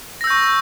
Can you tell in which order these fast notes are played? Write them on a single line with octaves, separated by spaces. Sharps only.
A#6 E6 G6 C#6